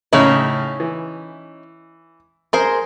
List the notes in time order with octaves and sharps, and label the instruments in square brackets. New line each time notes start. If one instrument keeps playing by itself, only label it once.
[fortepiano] A2 C#3 [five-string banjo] C#4 D#4 E4
[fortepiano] E3
[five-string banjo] G#4 A#4 C5 [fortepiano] C6